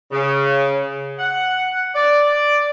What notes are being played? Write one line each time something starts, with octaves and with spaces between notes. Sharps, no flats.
C#3
F#5
D5